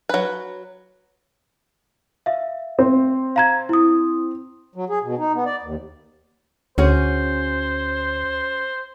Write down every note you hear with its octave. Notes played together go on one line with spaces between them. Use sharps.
F#3 B4
E5 F5
C4
F5 A#5 G#6
E4 D#6
F#3
G#4
B2
D#4
B3
D5
D#2
D2 C#4 F#4 G#4 C5